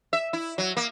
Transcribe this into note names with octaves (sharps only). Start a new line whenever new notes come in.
E5
E4
F#3
A#3